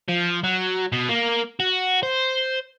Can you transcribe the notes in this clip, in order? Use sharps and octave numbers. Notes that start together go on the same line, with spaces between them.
F3
F#3
B2
A#3
F#4
C5